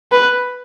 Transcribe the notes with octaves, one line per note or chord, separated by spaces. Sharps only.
B4